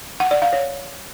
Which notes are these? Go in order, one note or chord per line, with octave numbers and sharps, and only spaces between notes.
F#5
D5
F5
C#5